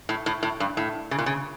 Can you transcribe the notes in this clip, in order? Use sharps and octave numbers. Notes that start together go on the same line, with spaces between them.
A2
A2
A2
G2
A2
C#3
A#2
C#3